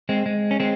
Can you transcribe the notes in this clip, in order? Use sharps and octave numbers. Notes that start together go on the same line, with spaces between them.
G#3 C4
G#3
C#4
G#3 C4